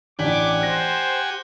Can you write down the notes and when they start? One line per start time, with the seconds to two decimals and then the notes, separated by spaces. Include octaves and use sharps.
0.19 A1 D4 G4 F#5 G#5 D6 B6
0.61 C5 F#6 A#6